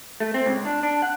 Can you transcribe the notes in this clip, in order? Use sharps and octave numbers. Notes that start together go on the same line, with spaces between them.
A3
C4
C#2
D4
D4
F#5